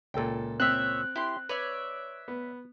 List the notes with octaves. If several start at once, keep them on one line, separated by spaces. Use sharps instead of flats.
C#2 A#2 A4 G5
C4 C5 C#5 E5 F#6
E4 G4 C6
B4 C#5 D5 E5
B3